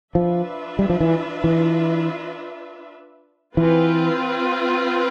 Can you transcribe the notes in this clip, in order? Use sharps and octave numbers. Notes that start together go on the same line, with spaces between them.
F3 D4 F4 B4 E5
G3
F3
E3
E3
E3 C4 F4 B4